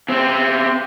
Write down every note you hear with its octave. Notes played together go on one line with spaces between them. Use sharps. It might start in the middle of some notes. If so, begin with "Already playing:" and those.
C#3 C4